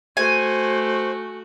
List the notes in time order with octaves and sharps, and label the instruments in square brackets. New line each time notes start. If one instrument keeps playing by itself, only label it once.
[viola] A3 F#4 [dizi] C5 [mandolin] G#5